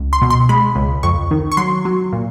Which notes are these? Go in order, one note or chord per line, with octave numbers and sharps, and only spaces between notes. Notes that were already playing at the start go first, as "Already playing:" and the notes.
Already playing: C#2
C6
B2
C6
G#3 B5
C#2
F2 C#6
D#3
C#6
F#3 C6
F#3
A#2